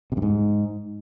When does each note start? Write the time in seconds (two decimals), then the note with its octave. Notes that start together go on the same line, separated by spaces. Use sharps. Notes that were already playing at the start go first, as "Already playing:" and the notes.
0.12 C3
0.17 G2
0.22 G#2